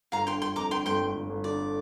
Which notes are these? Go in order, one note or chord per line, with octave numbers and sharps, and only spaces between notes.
G1 F5 A#5
D3 G5 C6
G1 G5 C6
F2 A#5 D6
D3 G5 C6
G1 G5 C6
G1
G1
G1
D3 D5